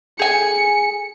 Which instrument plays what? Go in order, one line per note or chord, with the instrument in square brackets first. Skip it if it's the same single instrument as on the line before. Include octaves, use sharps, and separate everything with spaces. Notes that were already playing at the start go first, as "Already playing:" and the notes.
[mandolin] G#4 G#5 [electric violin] C#7